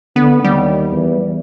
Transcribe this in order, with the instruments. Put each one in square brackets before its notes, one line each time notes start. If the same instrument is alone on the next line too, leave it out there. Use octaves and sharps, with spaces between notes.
[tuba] D3 [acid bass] B3
[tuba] D#2 [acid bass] G3
[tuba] E2